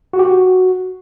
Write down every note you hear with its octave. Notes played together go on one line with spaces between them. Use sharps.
F#4
G4
F#4